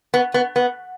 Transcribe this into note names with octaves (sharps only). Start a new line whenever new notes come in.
B3
B3
B3